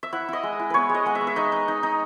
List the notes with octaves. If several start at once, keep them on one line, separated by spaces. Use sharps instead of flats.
E5
E4 F#5
E4 D#5
G#3
E4
B3 B4 C#5
G#3
D#5
G#3 F#5
E5
B3
E5
D#4 D#5
D#4
D#4
D#4